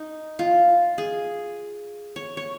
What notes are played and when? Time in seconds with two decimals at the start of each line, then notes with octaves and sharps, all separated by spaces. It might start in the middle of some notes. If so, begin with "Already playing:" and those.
Already playing: D#4
0.39 F4
0.98 G#4
2.16 C#5
2.37 C#5